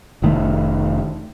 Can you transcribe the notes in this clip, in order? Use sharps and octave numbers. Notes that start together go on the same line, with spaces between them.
F1 D#3 A3